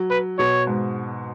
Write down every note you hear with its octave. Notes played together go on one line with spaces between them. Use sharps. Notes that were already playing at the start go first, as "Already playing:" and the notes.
Already playing: F#3
B4
B2 C#5
G#2